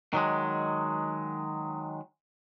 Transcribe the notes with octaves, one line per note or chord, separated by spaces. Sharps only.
D#3 F#3 G#3